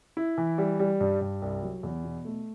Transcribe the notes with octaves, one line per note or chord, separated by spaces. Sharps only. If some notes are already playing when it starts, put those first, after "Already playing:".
E4
E3
G3
G3
G2
G2
C2
F#3
E2
B2
A3